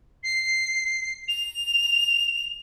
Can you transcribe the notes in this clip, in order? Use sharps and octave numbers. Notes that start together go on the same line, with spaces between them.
C7
F7